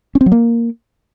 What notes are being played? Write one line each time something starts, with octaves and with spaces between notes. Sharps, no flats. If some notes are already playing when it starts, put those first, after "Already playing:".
C#4
C4
F#3
A#3